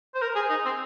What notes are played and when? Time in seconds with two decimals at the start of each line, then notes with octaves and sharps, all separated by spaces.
0.15 C5
0.22 A#4
0.36 G#4
0.50 D#4
0.65 C4